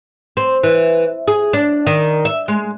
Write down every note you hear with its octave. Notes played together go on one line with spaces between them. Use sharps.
C4
E3
G#4
D4
D#3
E5
G#3